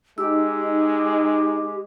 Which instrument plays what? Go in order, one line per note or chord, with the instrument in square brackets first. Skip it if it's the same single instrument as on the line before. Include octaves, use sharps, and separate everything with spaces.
[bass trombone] G#3 [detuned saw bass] D#4 [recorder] G4 [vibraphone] E6